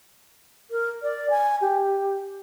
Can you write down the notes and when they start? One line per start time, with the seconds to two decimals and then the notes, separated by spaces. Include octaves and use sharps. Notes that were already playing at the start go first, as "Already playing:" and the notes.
0.71 A#4
1.03 D5
1.30 G#5
1.61 G4